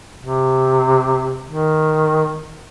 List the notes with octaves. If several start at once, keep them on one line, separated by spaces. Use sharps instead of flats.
C3
D#3